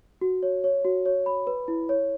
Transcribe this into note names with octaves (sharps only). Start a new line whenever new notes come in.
F#4
C#5
C#5
F#4
C#5
B5
B4
E4
C#5